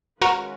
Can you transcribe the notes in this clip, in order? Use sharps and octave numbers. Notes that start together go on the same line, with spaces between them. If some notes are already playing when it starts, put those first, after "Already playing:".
D#3 G#3 C#4 F4 F#4 A#4 B4